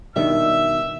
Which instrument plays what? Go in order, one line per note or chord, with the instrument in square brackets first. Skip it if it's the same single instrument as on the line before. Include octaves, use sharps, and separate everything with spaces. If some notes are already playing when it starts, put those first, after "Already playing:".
[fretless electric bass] B2 D#3 G3 [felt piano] D4 D#4 [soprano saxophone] E5 [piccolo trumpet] E6